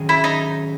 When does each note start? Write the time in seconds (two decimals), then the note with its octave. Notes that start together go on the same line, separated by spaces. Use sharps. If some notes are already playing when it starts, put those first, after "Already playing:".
Already playing: D#3 F#3 C#4 G#4
0.09 E4
0.24 D#4